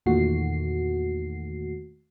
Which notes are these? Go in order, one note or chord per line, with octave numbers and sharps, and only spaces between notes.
E2 A#2 D#3 A3 F#4 C7